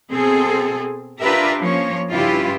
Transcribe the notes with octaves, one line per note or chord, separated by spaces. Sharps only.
B2 C4 G#4 A4
D4 F4 G4 A#4 B4 E5
F3 A#3 C#4 C#5
G2 C#3 E4 F4 G4 B4